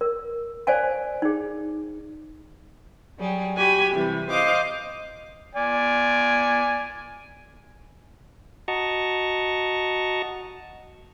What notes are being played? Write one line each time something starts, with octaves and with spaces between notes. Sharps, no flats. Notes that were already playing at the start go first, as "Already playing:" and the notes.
A#4
C5 D5 F5 G#5 A5
D#4 G#4
F#3 G3 G#4
F#4 G4 G#5 B5
C3 E3 G3
C5 D#5 F5 D6
D5 G#5
F#4 D#5 A5 A#5 C#6